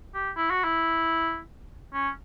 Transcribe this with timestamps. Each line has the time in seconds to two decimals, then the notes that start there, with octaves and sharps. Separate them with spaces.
0.14 G4
0.37 E4
0.50 F#4
0.64 E4
1.93 C#4